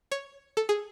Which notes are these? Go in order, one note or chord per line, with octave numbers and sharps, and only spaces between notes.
C#5
A4
G#4